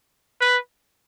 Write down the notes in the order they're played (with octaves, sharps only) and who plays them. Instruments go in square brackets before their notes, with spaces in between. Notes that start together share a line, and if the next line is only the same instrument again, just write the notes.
[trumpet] B4